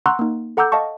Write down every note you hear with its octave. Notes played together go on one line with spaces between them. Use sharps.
F#5 A#5 C6 C#6 E6 F#6
A#3 D#4
A4 F#5 A#5 D6 E6 G6
D#5 F5 A5 C#6